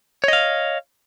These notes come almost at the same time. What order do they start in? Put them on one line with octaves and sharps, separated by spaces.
C#5 D#5 F5